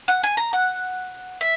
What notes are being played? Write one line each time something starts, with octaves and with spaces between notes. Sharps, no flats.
F#5
G#5
A#5
F#5
E5